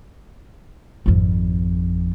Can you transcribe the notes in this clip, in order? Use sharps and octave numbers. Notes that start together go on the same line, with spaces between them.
G#1 F2